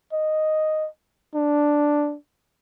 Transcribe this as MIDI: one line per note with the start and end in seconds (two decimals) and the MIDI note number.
0.13 0.88 75
1.35 2.16 62